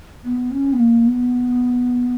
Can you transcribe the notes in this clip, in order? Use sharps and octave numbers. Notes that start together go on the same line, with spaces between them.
B3
C#4
B3
A#3
B3